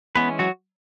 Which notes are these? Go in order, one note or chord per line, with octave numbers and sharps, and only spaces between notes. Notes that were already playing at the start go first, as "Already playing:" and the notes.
E3 G#3 B3 C#4 B4
F#3 F#4